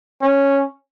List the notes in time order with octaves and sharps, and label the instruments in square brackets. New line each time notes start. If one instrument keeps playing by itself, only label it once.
[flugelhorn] C#4